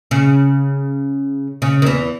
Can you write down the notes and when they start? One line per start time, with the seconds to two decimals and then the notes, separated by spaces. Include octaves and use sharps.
0.11 C#3
1.62 C#3
1.82 D#3
1.86 E2 E3